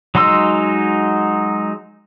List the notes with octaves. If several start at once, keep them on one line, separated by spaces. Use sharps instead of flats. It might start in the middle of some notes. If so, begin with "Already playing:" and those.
F#3 G#3 D#4 C6 E6